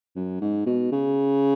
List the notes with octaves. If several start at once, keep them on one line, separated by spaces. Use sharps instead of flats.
F#2
G#2
B2
C#3